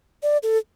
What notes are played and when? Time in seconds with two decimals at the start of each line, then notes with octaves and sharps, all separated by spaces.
0.23 D5
0.43 A4